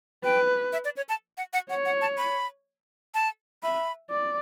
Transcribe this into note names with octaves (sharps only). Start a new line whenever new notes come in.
B4 G5
E5
D5
C#5
A5
F#5
F#5
C#5 F#5
F#5
A5
B5
A5
E5 B5
D5